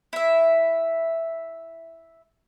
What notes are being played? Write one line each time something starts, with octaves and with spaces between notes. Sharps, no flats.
E4 E5